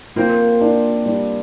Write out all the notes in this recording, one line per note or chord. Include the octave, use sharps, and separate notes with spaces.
A#3 C4 F4
D4
G3